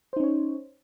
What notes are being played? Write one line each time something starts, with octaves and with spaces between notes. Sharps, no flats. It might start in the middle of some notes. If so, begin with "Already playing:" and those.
C#4 D#4 C5 C#5